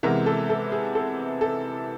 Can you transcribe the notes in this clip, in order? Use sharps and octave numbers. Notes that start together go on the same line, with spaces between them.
C3 E3 G#3 B3 A#4
A4
A4
G#4
A4
A4